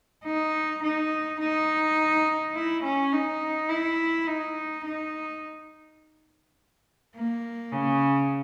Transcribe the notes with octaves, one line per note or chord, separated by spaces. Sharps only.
D#4
D#4
D#4
E4
C#4
D#4
E4
D#4
D#4
A#3
C#3